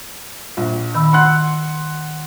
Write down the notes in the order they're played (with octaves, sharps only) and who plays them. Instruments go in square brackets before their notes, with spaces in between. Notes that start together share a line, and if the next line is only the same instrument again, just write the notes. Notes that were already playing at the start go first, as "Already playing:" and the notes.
[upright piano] A#1
[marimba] D#3 B5 E6
[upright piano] F#5 C6 F#6